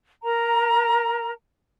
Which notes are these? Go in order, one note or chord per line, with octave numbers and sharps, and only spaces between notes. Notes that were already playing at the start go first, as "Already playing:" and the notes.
A#4 A#5